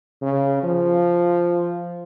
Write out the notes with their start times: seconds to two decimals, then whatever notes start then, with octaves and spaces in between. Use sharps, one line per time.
0.22 C#3
0.63 F3